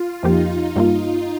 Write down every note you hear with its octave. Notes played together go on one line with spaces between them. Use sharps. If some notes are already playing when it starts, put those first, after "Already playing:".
Already playing: F4
F2 F3 A#3 D#4 G4
G2 G3 A#3 F4